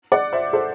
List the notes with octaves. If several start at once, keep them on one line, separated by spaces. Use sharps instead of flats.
D5 F#5
C5 E5
A4 C5